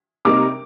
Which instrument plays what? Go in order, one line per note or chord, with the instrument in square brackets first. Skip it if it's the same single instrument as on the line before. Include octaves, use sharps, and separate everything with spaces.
[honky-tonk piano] C3 G3 A#3 D#4 A#4 [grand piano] D6